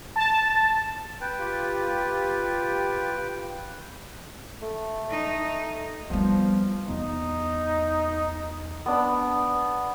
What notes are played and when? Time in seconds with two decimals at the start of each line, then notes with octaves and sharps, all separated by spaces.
0.16 A5
1.21 B4 G5
1.39 F4 G4
4.62 A3
5.10 D#4
6.10 F3 G3 B3
6.88 E2 D#4
8.86 B3 D4 B5